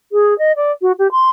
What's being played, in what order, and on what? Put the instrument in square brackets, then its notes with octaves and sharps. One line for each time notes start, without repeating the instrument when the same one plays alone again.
[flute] G#4
D#5
D5
F#4
G4
C6